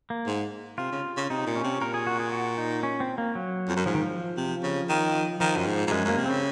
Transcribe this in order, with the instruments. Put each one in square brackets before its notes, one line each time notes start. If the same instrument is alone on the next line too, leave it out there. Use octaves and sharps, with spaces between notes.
[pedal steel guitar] A#3
[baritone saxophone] G#2
[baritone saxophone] C3 [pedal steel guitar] F4
[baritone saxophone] C#3
C#3
[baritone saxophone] C3 [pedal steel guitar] D#4
[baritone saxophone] A#2
[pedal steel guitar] C#4
[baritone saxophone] C3
[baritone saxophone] A#2 [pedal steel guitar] A#4
[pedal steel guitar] G#4
F#4
G#4
F#4
D#4
C#4
C4
A#3
F#3
[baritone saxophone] F2
F#2
[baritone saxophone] G#2 [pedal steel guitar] F3
[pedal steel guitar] D#3
F3
[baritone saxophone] C3
C#3
D#3
[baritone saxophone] D#3 [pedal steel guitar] F3
[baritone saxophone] F#2
G#2
G#2
[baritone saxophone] F#2 [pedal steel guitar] G#3
[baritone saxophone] F#2
[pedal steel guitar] A#3
[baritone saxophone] C3
[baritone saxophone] C#3 [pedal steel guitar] C4